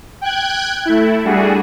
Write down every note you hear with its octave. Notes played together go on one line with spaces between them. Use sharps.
G5 F#6 G#6
A3 E4
G3 A3 D4 F#4 G#4